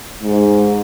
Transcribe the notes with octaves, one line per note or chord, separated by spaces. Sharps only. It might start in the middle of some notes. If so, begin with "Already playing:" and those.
G#2